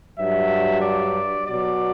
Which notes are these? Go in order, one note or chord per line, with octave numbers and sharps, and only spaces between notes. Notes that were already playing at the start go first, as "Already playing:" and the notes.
G2 F#3 E5
D5
B2 F#3 D5